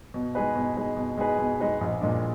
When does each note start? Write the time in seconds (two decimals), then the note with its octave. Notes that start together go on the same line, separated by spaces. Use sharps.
0.14 B2
0.35 G#3 D#4 G#4 B4
0.55 B2
0.77 G#3 D#4 G#4 B4
0.97 B2
1.17 G#3 D#4 G#4 B4
1.38 B2
1.60 G#3 D#4 G#4 B4
1.81 A#1
2.01 A#2 G#3 D4